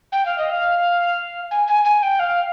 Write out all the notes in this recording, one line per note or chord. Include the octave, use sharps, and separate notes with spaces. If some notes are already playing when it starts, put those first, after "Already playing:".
G5
F5
D#5
F5
G#5
G#5
G#5
G5
F5